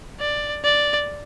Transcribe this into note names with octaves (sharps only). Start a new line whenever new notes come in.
D5
D5